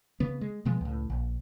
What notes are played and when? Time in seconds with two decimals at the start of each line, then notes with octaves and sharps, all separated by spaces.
0.20 C#3 B3
0.41 G#3
0.65 B2 F3 G#3 B3
0.81 C#2 A2
1.10 A#1